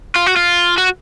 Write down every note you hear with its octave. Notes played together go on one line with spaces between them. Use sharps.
F4
F#4
F4
F#4